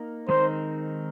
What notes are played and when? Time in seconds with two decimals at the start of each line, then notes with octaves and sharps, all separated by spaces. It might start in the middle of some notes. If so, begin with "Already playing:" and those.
Already playing: A#3 D#4 A#4
0.28 D#3 G#3 C4 D#4 A#4 C5